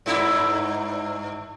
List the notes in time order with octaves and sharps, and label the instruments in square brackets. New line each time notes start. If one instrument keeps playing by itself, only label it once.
[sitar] G2 D#4 E4